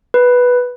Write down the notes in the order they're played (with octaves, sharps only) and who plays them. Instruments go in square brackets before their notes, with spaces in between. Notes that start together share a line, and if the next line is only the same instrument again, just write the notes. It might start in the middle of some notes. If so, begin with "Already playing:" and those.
[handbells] B4